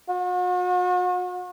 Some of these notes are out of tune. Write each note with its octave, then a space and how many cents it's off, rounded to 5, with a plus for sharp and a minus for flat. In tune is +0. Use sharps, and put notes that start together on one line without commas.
F#4 -40